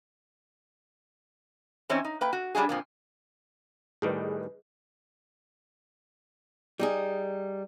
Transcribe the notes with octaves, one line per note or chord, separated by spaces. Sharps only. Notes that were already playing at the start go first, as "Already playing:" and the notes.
E3 C4 C#4 D#4 C5 C#5
D#4
A#3 B4 G5
F#4
F#3 G3 D4 F#4 G#4
F2 A#2 F3
A2 D#3 G3 G#4 B4 D#5
G3 D#4 G#4